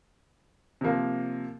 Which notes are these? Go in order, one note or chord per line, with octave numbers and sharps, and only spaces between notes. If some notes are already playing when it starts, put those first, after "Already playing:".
C3 F3 A#3